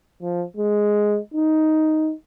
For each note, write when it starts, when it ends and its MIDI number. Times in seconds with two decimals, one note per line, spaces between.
0.22 0.45 53
0.57 1.18 56
1.34 2.12 63